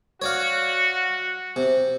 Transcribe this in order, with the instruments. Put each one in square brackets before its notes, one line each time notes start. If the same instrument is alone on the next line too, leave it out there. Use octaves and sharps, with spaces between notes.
[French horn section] F#4 [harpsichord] C#5 D5 F5
[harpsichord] C3